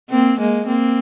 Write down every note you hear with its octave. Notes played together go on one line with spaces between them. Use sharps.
A#3 C4
G#3 A#3
A#3 C4